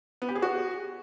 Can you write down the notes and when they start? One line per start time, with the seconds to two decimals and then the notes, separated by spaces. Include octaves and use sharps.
0.22 B3
0.29 G4
0.35 G#4
0.42 F#4